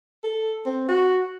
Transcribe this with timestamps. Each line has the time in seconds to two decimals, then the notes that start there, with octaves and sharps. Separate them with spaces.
0.24 A4
0.66 C4
0.89 F#4